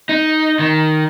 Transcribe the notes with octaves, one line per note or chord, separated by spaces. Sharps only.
D#4
D#3